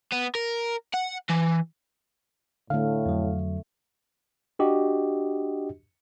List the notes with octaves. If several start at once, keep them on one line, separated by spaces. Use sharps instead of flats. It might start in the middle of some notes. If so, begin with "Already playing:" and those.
B3
A#4
F#5
E3
A2 D3 A3 F5
F2 F#3
D4 F#4 G4 D#5